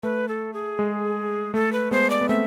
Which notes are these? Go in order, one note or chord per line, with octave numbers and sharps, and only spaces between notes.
A3 B4
A4
G#4
G#3
A3 A4
B4
G#3 B3 C5
D5
B3
A3 C4 E5